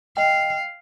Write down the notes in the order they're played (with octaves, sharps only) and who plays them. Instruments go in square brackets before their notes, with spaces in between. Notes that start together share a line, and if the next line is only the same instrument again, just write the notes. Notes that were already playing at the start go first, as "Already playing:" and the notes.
[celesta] D#5 G5 [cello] F5